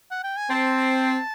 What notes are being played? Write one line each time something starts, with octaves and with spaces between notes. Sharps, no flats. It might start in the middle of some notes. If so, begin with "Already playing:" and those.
F#5
G5
G#5
C4 A5